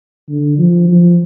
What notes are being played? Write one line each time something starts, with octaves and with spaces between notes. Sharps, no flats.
D3
F3
F3